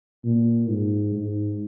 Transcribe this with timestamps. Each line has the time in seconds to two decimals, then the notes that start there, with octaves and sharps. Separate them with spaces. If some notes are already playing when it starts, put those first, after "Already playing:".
0.24 A#2
0.69 G#2
1.15 G#2